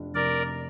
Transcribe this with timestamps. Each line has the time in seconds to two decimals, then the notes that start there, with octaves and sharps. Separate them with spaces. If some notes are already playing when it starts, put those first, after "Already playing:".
Already playing: F1 F3 D4
0.14 F1 A#4 D5